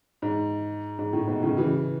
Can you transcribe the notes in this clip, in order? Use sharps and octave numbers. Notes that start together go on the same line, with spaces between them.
G#2
G#2
A2
G#2 B2
A2 C#3
C#3 E3